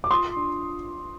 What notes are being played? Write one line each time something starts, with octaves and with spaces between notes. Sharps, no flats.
D6
F4 C6 D#6
D4